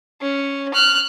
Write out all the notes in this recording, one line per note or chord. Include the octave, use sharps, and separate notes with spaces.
C#4
F6 F#6